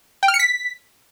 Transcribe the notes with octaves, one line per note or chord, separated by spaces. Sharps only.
G5
F6
C#7
B6